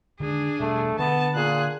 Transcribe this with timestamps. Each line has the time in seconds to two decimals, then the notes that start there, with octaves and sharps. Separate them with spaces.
0.20 D3 D#3 G#3 D4 G#4
0.60 E1 B2 G3 A3
0.99 D3 B3 A5
1.35 A#2 G#4 F#6